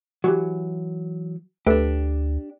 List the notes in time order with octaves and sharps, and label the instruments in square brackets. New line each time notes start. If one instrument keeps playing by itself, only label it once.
[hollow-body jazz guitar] E3 F#3 [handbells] F#4 G4
[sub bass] D2 [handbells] A3 A4 B4 [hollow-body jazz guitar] D4 G4